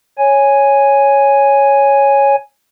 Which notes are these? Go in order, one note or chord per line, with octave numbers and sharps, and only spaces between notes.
C#5 G#5